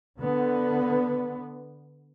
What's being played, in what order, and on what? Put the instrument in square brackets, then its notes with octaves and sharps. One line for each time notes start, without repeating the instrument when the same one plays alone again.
[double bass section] D3 B3